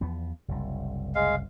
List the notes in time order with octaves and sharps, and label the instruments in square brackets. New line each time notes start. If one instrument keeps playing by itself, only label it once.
[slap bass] E2 F3 B3
F#1 C2
[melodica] G#3 F5